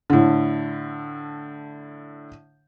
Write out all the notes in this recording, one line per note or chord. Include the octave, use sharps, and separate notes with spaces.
A2 D3